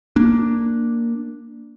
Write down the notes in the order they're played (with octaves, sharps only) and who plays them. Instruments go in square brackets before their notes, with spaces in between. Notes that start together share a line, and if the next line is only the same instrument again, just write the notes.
[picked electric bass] A#3 D4